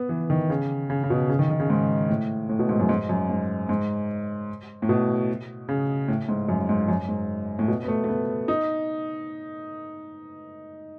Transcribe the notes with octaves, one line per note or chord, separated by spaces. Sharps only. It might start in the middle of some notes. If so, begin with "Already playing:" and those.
Already playing: B3
E3
D#3
C#3
C#3
C#3
B2
C#3
D#3
D#3
C#3
G#2
A2
A2
B2
G#2
F#2
G#2
F#2
G#2
G#2
A2
B2
C#3
A2
G#2
F#2
G#2
F#2
G#2
A2
B2
B3
A3
A3
B3
D#4